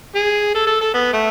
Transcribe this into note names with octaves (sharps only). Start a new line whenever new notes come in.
G#4
A4
A4
A4
B3
A3